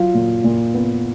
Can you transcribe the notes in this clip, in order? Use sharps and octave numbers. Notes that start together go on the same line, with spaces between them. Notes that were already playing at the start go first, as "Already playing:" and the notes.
Already playing: F#3 F4 F5
A#2
A#2
B3